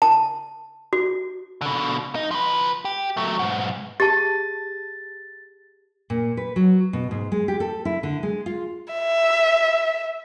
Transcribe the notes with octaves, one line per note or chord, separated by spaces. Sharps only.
A5
F#4
B2 D3
D#4
F3 B4
G4
F#3 A3
B1 G#2
G4 G#4 A5 A6
A#2
B4
F#3
B2
G#2
G#3
G4
A4
E4
D3
G#3
F4
E5